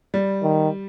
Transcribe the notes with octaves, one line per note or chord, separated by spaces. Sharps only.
G3
D#3